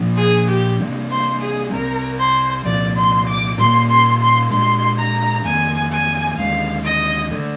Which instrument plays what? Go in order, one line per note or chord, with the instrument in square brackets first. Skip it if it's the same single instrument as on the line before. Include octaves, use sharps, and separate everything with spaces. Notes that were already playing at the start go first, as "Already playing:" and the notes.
Already playing: [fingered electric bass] A#2 F3 A#3 D4
[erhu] G#4
G4
[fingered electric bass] C3 G3 A#3 D4
[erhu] C5
G#4
[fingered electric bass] C2 C3 G3 [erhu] A#4
[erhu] C5
[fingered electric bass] C2 A#2 F3 [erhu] D5
[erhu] C6
D6
[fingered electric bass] A#2 G3 A#3 [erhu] C6
[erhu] C6
C6
[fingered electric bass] A#2 G#3 D4 [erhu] C6
[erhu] A#5
[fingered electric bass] F2 D#3 A#3 [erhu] G#5
[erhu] G#5
[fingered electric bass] D#2 D3 G#3 [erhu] F5
[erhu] D#5
[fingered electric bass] D2 D3 G#3 D4